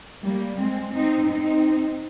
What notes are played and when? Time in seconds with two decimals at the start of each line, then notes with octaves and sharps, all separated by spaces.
0.23 G3 A#3
0.58 G#3 C4
0.94 C4 D#4
1.29 C4 D#4